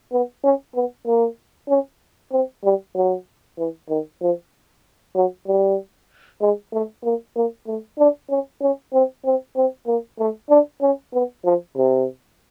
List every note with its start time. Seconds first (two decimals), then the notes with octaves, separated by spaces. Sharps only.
0.12 B3
0.44 C#4
0.75 B3
1.06 A#3
1.69 C#4
2.32 C4
2.64 G3
2.95 F#3
3.58 E3
3.89 D#3
4.22 F3
5.16 F#3
5.47 G3
6.41 G#3
6.73 A3
7.04 A#3
7.36 A#3
7.67 A3
7.99 D4
8.30 C#4
8.61 C#4
8.93 C4
9.25 C4
9.56 C4
9.87 A#3
10.19 A3
10.50 D4
10.82 C#4
11.14 B3
11.45 F3
11.77 C3